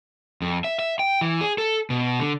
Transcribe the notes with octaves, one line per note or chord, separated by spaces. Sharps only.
F2
E5
E5
G5
E3
G#4
A4
B2
D3